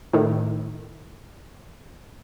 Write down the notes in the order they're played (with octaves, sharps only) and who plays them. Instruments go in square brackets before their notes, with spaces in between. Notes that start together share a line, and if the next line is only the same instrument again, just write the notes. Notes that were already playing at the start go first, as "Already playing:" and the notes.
[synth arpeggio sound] A2 D#3